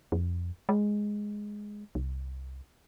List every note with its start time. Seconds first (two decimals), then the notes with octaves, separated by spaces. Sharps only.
0.12 F2
0.69 G#3
1.95 C2